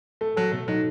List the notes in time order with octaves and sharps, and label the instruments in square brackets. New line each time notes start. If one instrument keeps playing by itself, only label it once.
[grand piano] A3 [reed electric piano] A4
[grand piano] F#3 [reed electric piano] A4
[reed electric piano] B2 [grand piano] A3
[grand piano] F#3 [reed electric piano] D#4